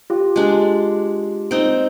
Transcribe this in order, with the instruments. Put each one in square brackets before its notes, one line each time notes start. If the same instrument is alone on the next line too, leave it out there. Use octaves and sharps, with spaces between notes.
[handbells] F4 G4
[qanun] G#3 D4
C4 D#4